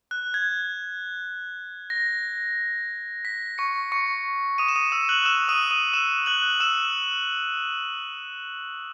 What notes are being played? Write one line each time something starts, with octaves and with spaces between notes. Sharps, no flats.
F#6
G#6
A#6
B6
C#6 C#7
C#6 C#7
D#6 D#7
E7
D#6 D#7
E6 E7
F#6 F#7
E6 E7
D#6 D#7
D#6 D#7
E6 E7
F#6 F#7
F#7
E6 E7